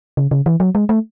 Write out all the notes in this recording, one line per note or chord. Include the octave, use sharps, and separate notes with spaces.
C#3
C#3
E3
F#3
G#3
A3